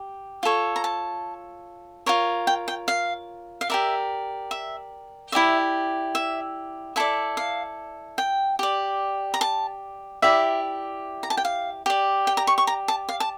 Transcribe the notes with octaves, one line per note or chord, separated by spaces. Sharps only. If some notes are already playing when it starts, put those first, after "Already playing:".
Already playing: G4
F4 A4 C#5
A#5
A5
F4 A#4 C#5
G5
G5
F5
F5
G4 A#4 D5 E5
E5
E4 G4 D5 E5
E5
E4 A4 D5 E5
F5
G5
G4 D5
A#5
A5
E4 G4 D5 E5
A#5
A5
G5
F5
G4 D5
G5
A#5
C#6
C#6
A#5
A5
F5
A5